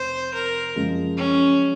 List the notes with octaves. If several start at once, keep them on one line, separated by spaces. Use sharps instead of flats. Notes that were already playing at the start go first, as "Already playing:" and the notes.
Already playing: F1 C5
A#4
F#1 F#2 F3 G#3
C#4